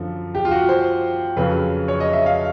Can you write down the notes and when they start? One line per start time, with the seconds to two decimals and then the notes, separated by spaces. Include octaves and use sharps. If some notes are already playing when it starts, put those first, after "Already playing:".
Already playing: F#2 D3 F3
0.35 G4
0.45 F4
0.51 F#4
0.69 C5
1.37 F2 C#3 F#3 B4
1.88 C#5
2.00 D#5
2.13 E5
2.26 F5